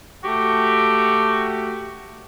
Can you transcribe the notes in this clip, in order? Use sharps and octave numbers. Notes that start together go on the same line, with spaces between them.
A3 F#4 G4